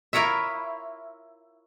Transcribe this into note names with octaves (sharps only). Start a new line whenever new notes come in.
E4 F4 A#4 C#5 E5